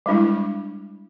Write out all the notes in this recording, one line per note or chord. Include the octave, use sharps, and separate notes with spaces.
G3 G#3 D4 E4